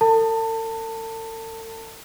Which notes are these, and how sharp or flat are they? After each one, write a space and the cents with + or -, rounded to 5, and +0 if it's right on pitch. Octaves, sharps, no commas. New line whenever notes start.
A4 +45 A5 +25